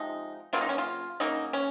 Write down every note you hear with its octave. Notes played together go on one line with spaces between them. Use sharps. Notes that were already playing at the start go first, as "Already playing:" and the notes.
Already playing: C3 F3 G#3 D#4
C#3 F#3 A#3 F4
D#4
C#4
F4
C#3 F#3 A#3 D#4
C#4